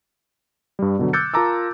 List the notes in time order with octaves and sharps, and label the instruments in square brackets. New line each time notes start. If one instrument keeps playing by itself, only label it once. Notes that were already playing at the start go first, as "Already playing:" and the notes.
[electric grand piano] G2 G3
B2 D3 F#3
D6 E6 F#6 G6 A6 C#7
F4 A#4 A5 A#5 D6 E6